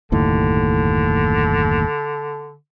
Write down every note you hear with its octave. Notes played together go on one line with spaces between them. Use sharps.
F#1 D#2 A2 D3